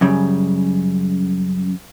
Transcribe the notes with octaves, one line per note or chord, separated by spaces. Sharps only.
F#2 C#3 G3